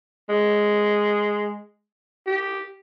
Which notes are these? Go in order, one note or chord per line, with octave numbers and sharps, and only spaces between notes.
G#3
G4